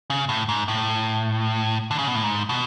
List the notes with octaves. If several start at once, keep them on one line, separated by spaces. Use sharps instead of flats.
C#3
A2
G#2
A2
D3
C#3
B2
A2
G#2
B2